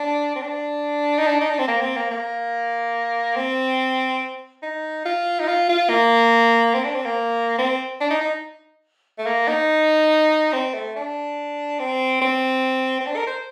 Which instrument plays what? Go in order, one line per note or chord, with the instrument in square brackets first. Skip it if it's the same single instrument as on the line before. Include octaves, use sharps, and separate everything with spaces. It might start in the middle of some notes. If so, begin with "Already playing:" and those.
Already playing: [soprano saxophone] D4
C4
D4
D#4
D4
D#4
D4
C4
A#3
C4
A#3
A#3
C4
D#4
F4
D#4
F4
F4
A#3
C4
D4
C4
A#3
C4
D4
D#4
D#4
A3
A#3
D#4
C4
A3
D4
C4
C4
C4
D4
A#4
C5